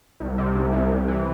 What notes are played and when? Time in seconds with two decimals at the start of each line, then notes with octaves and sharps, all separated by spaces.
0.20 C2
0.38 C3
0.55 C2
0.73 C2
0.91 C2
1.08 E3